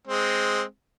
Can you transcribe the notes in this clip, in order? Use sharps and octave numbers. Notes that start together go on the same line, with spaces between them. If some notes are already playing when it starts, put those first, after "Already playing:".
G#3 C4